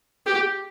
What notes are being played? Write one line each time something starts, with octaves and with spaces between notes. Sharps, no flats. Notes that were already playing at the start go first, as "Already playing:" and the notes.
G4